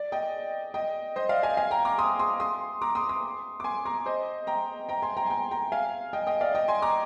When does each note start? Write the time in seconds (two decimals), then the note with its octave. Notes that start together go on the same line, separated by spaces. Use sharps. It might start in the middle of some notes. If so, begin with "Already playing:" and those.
Already playing: D5
0.12 D#5 G5
0.74 D#5 G5
1.16 C5 D#5
1.29 D5 F5
1.43 F5 G#5
1.57 F5 G#5
1.71 G5 A#5
1.85 A#5 D6
1.98 C6 D#6
2.19 C6 D#6
2.40 C6 D#6
2.82 A#5 D6
2.95 C6 D#6
3.09 C6 D#6
3.60 D6
3.64 G#5 C6
3.85 A#5 D6
4.06 C5 D#5
4.47 G5 A#5
4.89 G5 A#5
5.02 G#5 C6
5.17 G5 A#5
5.26 G#5
5.30 G5 A#5
5.51 G5 A#5
5.72 F5 G#5
6.13 D#5 G5
6.27 D#5 G5
6.41 D5 F5
6.55 D#5 G5
6.68 G#5 C6
6.82 A#5 D6